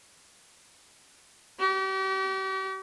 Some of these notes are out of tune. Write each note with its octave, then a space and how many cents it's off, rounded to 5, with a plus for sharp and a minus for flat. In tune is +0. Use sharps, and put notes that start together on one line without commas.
G4 -40